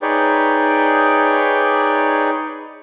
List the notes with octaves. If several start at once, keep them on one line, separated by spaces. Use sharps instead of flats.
D#4 G#4 B4 C#5 D5 G5